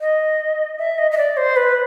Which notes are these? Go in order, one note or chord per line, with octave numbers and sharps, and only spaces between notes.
D#5
E5
D#5
D#5
D5
C5
B4